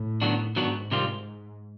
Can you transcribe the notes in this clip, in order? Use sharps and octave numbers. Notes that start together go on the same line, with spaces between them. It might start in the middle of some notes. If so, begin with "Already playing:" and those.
Already playing: A2
D#3 F#3 B3 D4 F#4
G#2 D#3 F#3 B3 D4 F#4
C3 D#3 G3 C4 F4